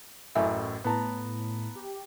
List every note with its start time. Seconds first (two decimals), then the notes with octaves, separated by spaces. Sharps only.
0.35 A1 F#2 A2 E5 G#5
0.84 A2 B3 A5 A#5
1.76 G4